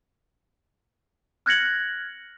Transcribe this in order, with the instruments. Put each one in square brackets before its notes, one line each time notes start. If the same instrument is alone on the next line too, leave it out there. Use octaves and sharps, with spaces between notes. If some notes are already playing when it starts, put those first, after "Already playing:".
[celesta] F6 F#6 G#6 A#6 C#7 F#7